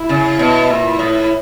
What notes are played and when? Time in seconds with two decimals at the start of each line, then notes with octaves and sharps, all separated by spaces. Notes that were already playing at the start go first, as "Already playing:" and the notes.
Already playing: E4
0.09 C#3
0.39 B2
0.70 A#2
0.99 A2